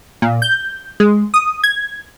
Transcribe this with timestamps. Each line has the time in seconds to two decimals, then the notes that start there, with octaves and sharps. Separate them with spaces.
0.22 A#2
0.42 G6
1.00 G#3
1.34 D#6
1.64 G#6